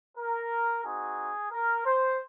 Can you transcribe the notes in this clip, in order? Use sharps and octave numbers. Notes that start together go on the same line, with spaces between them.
A#4
C4 D#4 F#4 G#4
A#4
C5